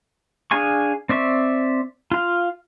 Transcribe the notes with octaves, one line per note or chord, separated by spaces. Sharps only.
D4 G#4 F5 G#5 C#6
C4 D5 E5 C#6
F4 F5